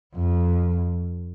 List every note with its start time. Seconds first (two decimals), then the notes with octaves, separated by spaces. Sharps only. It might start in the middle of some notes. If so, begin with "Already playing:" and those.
0.15 F2